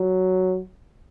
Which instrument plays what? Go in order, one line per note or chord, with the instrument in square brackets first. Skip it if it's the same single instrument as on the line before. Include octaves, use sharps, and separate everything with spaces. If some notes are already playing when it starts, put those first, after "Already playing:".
Already playing: [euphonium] F#3